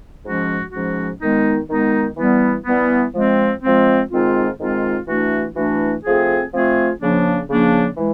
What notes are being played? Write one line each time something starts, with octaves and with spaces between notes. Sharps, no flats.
G#2 F3 G#3 C#4 F#4
G#2 F3 G#3 C#4 F#4
D#3 G#3 B3 D#4
D#3 G#3 B3 D#4
E3 G3 B3
E3 G3 B3
F3 G#3 C4
F3 G#3 C4
G#2 D#3 G#3 C4 F4
G#2 D#3 G#3 C4 F4
E3 A3 D4 F#4
E3 A3 D4 F#4
F3 A3 C4 F4 G#4
F3 A3 C4 F4 G#4
C#3 F3 A#3 D4
C#3 F3 A#3 D4
E3 G#3